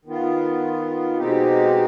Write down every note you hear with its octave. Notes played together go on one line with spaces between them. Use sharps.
D#3 B3 F4
B2 G#3 C4 D#4 G4